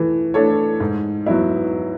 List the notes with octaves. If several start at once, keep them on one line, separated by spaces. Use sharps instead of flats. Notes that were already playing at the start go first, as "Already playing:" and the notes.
Already playing: E3 A3
A3 D4 A4 C#5
G#2
F#3 B3 E4